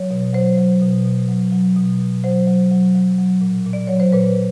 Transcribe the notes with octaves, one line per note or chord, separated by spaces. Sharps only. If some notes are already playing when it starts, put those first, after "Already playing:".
Already playing: F#3 C#5
B2
F#3 C5
F#3
B2
B2
F#3
F#3
B2
B2
F#3 C5
F#3
F#3
F#3
F#3
A#2
A#2
D5
F#3 C#5
C5
A#2 B4